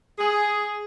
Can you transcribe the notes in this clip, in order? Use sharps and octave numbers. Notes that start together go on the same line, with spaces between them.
G#4